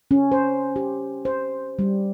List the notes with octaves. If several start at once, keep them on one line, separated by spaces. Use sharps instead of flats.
C#4
C5
G4
C5
G3